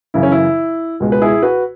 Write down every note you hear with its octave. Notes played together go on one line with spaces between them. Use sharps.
F#2 C#3 E3 E4
C#4
E4
C#2 B2 G#3
B4
E4 G#4
F#4 B4